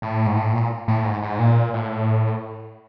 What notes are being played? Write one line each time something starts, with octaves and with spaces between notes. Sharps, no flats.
A2
G#2
A2
A#2
A2
G#2
G#2
A#2
A2